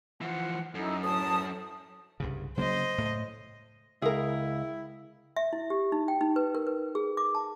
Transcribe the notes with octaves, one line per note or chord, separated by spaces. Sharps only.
E3 F3 F#5
F#2 D#4 E4 A4
D2 A2 A5 D#6
C2 G2 C#3
C#3 F#3 A#3 C5 D#5
A2
C#2 E4 G#4 A#4
E5
E4
G4
D#4
G5
D#4
B4
A#4
B4
G#4
D6
A5